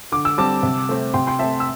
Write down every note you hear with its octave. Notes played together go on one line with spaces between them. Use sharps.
D3 D6
E6
G3 C4 A5 D6
C3
A3 C4
C3 G5 C6
G5 C6
A3 C4 E5 A5
E6